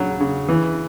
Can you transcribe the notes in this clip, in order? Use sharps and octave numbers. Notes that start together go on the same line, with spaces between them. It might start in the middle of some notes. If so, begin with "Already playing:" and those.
Already playing: C#3 F#3
C#3
E3